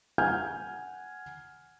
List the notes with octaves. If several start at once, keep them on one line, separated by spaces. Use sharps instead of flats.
F#5 G#5 F6 G6 G#6